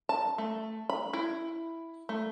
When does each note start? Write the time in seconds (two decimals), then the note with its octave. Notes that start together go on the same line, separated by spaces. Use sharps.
0.09 A5
0.38 A3
0.90 B5
1.13 E4
2.09 A3